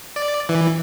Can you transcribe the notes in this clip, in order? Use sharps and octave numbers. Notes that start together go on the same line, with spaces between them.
D5
E3